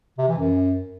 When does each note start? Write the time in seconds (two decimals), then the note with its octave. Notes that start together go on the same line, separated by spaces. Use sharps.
0.18 C3
0.29 E3
0.39 F#2